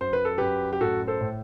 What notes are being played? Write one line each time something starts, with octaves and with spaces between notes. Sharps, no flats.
F#2 C5
B4
A4
F#2 G4 B4
G4
A2 F#4 A4
A4 C5
A2